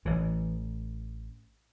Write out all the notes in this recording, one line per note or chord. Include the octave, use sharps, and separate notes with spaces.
A1 A2 E3